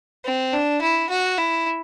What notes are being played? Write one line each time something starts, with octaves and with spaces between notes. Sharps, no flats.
C4
D4
E4
F#4
E4